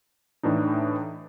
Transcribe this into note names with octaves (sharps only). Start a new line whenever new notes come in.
A2 E3 D4 D#4